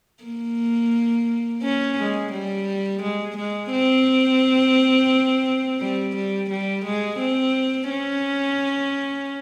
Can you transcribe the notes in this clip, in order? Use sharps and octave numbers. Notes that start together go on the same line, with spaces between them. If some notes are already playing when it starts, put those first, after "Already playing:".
A#3
C#4
G#3
G3
G#3
G#3
C4
G3
G3
G3
G#3
C4
C#4